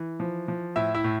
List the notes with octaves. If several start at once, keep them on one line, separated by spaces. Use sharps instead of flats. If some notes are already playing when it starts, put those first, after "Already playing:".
Already playing: E3
F3
F3
A2 E4 E5
E4 E5
A2